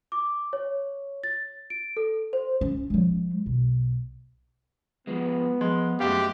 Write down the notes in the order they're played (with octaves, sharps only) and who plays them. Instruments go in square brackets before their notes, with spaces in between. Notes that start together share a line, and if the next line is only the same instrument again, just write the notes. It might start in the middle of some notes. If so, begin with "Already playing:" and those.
[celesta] D6
C#5
A6
D7
A4
C5
[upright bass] C#4
F3 G#3
B1
[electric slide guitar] F3 G#3 [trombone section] B3
[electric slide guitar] F3 [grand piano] G#3
[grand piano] F#2 G#3 [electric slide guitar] A3 E5 F5 [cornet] G4